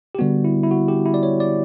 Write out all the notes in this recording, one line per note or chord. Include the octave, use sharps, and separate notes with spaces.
G4
D3 G3 B3 F#4
E4
E4
F#4
G4
E4
D5
C#5
D5